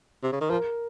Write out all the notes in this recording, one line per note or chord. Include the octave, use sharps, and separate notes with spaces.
C3
C#3
D#3
F3 A#4